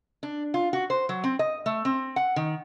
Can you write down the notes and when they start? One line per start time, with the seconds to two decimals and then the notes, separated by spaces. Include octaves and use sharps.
0.23 D4
0.54 F4
0.73 F#4
0.90 C5
1.09 F#3
1.24 C4
1.39 D#5
1.66 A3
1.85 C4
2.16 F#5
2.36 D#3